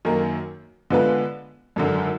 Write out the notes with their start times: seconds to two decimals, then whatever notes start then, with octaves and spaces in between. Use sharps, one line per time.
0.05 F#2 D#3 A#3
0.90 D3 G#3 B3 F4 B4
1.76 G#1 F#2 D3